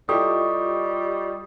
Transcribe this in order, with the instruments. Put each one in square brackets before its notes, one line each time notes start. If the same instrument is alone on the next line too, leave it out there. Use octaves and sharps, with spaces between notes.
[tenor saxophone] G3 [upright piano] E4 G4 A4 [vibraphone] F4 D#5 C#6 [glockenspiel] D#6